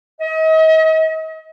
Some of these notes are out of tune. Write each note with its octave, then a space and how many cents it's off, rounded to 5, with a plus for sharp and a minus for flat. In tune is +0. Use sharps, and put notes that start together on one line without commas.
D#5 +40